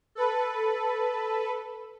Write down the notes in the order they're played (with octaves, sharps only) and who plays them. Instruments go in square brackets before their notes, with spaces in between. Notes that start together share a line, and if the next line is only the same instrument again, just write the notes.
[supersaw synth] A4 B4